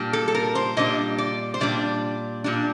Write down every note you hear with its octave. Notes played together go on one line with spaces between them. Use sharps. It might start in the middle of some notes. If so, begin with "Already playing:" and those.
Already playing: A#2 G3 D4
A4
A4
A#4
C5
A#2 G3 D4 D#5
D5
C5
A#2 G3 D4 D5
A#2 G3 D4